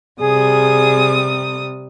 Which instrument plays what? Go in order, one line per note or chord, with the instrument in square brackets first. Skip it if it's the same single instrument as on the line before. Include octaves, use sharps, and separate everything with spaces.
[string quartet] C3 G3 D#6 [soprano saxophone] G#4